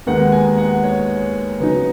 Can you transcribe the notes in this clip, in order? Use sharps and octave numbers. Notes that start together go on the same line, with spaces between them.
D#2 D#3 G#3 B3 D#4 F#5
G#5
F#5
C#5
C#3 F#3 B3 D#4